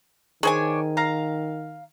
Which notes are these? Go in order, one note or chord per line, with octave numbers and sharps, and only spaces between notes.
D#3 D4 G#4 C5 C#5 G#5
F5 A#5